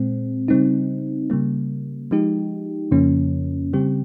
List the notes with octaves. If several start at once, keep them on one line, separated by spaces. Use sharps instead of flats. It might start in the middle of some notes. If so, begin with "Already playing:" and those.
Already playing: A#2 G#3 C4
C#3 G3 C4 D#4
C#3 G3 A#3
F3 G#3 D#4 G4
F2 C#3 F3 A#3 C#4
C#3 G3 C4 G4